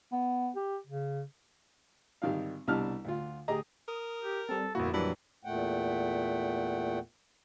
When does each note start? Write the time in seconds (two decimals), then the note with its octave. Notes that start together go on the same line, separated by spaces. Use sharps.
0.12 B3
0.56 G4
0.87 C#3
2.22 G#1 D#3 G3 F5
2.67 C2 B2 G3 D4 A5 F6
3.05 D2 F4
3.48 D2 G4 G#4 D#5 A#5
3.88 A#4 D#6
4.22 G4
4.49 G3 C4 A4
4.75 G1 F2 A#2 A#3 E4 F#4
4.94 E3 F#3 G3 D4 E4
5.45 E2 A#2 A3 F#5 G5